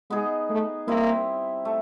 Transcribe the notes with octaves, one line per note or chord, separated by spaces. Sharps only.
G#3 B3 D#4 G#4
A3
G3 A#3 C4 E4
A3